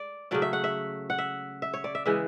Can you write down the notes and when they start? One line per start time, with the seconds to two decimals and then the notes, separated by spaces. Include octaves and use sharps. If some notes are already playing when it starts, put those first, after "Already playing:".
Already playing: D5
0.31 C#3 F#3 A3 D5
0.42 E5
0.53 F#5
0.64 E5
1.10 F#5
1.18 E5
1.62 E5
1.74 C#5
1.84 D5
1.95 E5
2.06 C#3 E3 G#3 E5